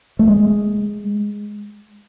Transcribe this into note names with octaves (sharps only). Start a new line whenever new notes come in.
A3
G#3